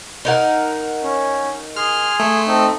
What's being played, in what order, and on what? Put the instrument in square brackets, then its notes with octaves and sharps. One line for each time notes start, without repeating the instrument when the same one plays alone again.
[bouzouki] D#4 A#4 F#5
[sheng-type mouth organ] C#4
[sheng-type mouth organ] G#4 C6 [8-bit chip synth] F6
[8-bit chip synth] A3
[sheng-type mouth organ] C4 D#4 A4